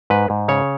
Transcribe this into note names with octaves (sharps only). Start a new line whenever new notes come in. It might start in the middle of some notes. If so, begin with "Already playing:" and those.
G#2 B4
G#2
C#3 C#5